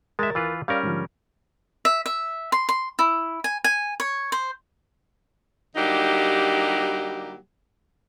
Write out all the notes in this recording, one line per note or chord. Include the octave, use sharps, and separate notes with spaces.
D#2 G#3 A#4 E5 A6
E3 F4 B4
G3 C#4 A#4 D5 F5
G#2 D3 F3
E5
E5
C6
C6
E4
G#5
G#5
C#5
C5
D3 F#3 G3 A#3 D#4 G4